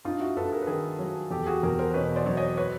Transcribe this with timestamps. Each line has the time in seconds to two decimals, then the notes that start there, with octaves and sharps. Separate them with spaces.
0.05 G2 D#4 F4
0.20 E4 F#4
0.37 G2 A4 B4
0.52 G#4 A#4
0.62 B4
0.67 D#3 G#4 A#4
0.99 F#3
1.31 E2 G4 A4
1.47 F#4 G#4
1.63 E2 G#4 A#4
1.79 A#4 C5
1.94 B2 B4 C#5
2.16 C5 D5
2.26 F#3
2.37 C#5 D#5
2.57 B4 C#5